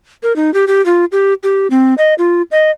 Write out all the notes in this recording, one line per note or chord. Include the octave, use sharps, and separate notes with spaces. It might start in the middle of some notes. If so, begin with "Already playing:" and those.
A#4
D#4
G4
G4
F4
G4
G4
C4
D#5
F4
D#5